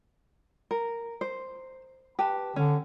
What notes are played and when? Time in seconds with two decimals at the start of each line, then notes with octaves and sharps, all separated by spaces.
0.71 A#4
1.21 C5
2.19 G4 B4 A5
2.56 D3 C#4